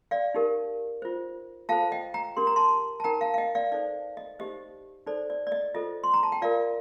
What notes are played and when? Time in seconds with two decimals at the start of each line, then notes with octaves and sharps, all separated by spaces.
0.11 D5 F5
0.34 D#4 G4 A#4
1.02 F4 C5
1.69 F4 A4 C5 F5 A5
1.92 D#5 G5
2.14 G5 A#5
2.37 D4 G4 A#4 C6
2.47 A#5
2.56 A5 C6
3.00 A5
3.04 D#4 A#4 G5 A#5
3.21 F5 A5
3.34 F5
3.38 D#5 G5
3.55 D5 F5
3.72 D#4 A4 C5 D5
4.17 D#5
4.39 D#4 G4 C5 D#5
5.07 D#4 A4 C5 D5
5.30 D5
5.47 D5
5.52 D#5
5.74 F4 A4 C5 D#5
6.04 C6
6.14 A#5
6.23 A5
6.32 G5
6.42 F4 A#4 D5 F5